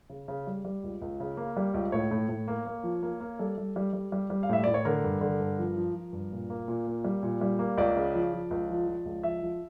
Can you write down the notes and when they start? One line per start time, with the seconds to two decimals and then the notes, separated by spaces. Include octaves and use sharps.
0.09 C#3
0.28 C#3
0.47 G3
0.65 G3
0.83 C#2
1.01 C#2
1.20 C#3
1.37 A#3
1.57 G3
1.74 C#2
1.92 A2 C#5
2.11 A2
2.29 A2
2.48 A#3
2.66 A#3
2.83 F3
3.03 A#3
3.20 A#3
3.39 G3 A4
3.58 G3
3.76 G3
3.93 G3
4.12 G3
4.30 G3
4.43 F5
4.49 A2 E5
4.64 A2 D5
4.74 C#5
4.85 D3 A#4
5.04 G2
5.21 D3
5.40 G2
5.58 F3
5.77 F3
5.95 F3
6.13 G2
6.32 A#2
6.50 A#3
6.68 A#2
6.87 A#3
7.04 G3
7.23 A#2
7.41 G3
7.59 A#3
7.78 C#2 D5
7.96 C#3
8.15 F3
8.33 F3
8.51 C#2
8.70 F3
8.87 F3
9.06 C#2
9.23 F3 E5
9.42 F3